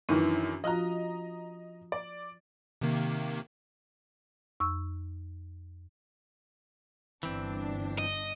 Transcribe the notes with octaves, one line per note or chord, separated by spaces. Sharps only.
F#2 D#3 E3 C#4 D4
F3 F4 F#4 D#5 A#5
D5
C3 D#3 A#3
F2 C#6 E6
G1 E3 C4 D4
D#5